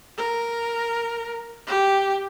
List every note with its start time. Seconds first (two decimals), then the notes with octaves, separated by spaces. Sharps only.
0.17 A#4
1.67 G4